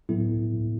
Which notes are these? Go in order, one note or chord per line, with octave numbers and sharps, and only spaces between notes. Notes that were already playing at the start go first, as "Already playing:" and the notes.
A2 F#3 B3 E4 A4